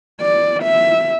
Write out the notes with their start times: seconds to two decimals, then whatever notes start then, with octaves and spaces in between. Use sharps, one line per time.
0.21 D5
0.63 E5